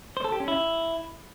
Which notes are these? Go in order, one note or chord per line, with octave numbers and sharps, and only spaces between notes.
C5
A4
G4
C#4
E4